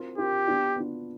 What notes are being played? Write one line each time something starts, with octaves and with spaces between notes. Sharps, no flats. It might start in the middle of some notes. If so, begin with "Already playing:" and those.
Already playing: C4 F4 A#4
C4 F4 G4 A#4
B3 D4 F4
B3 D4 F4